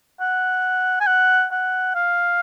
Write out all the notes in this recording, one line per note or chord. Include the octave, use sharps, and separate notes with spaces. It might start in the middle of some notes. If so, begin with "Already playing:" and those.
F#5
G#5
F#5
F#5
F5